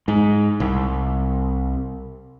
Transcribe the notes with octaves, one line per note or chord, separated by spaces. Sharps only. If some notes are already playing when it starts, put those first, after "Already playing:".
G#2
C2